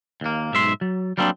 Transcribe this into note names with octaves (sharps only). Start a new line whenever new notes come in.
D#2 A#3
B1 G#2 E5 C6
F#3
F#3 G3 A#3 C4 D4